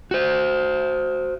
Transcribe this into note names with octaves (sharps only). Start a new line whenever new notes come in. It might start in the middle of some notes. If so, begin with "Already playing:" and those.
F#4 C5